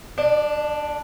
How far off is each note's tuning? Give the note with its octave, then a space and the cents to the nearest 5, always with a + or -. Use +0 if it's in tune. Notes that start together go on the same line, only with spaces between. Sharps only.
D4 +0 D5 +45